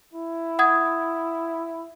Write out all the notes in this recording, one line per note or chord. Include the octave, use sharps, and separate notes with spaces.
E4
F#5 D#6 G#6